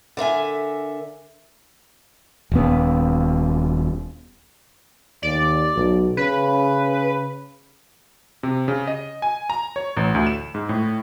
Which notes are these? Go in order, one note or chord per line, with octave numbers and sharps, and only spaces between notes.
D3 A#4 E5 G#5
D#1 B3
D#2 D5
B1
C#3 B4
C3
C#3
D#5
G#5
A#5
C#5
A1
D2
E7
G#2
A2